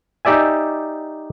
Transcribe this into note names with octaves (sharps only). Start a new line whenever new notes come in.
D#4 G4 D5 E5 G#5